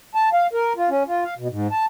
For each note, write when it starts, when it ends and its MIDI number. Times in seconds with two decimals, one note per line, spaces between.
0.15 0.29 81
0.33 0.47 77
0.53 0.73 70
0.77 0.89 65
0.90 1.03 61
1.07 1.24 65
1.24 1.34 77
1.38 1.48 47
1.51 1.67 44
1.71 1.86 81